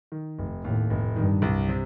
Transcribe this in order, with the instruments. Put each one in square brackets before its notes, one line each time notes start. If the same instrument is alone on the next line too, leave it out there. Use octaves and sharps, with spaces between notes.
[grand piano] D#3
F1
[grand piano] D#2 [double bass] A2
[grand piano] F1
[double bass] G2 [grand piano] D#3
[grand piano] C2
C3